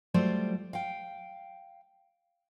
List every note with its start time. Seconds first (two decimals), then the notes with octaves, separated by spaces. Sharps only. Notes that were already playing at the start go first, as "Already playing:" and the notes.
0.14 F#3 G3 A3 F4 C5 D5
0.73 F5 G5